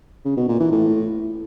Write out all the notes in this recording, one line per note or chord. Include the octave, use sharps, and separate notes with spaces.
C#3
B2
A#2
E3
A2